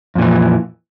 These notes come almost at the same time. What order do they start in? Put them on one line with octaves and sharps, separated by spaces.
F2 A#2 E3